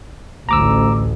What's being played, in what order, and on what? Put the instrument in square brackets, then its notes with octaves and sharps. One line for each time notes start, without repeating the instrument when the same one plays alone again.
[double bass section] A1 D2 [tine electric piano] A#5 D6 E6